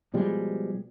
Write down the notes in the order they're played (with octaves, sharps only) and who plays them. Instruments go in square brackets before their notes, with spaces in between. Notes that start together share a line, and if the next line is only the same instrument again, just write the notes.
[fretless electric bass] B2 F3 G3 G#3